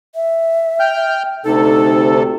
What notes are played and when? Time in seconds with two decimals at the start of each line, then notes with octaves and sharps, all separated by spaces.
0.15 E5
0.80 G5 F6 G6
1.45 D2 C3 D#4 A4